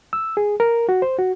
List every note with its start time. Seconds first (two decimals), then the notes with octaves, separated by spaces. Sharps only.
0.13 E6
0.37 G#4
0.60 A#4
0.89 F#4
1.02 C5
1.19 F#4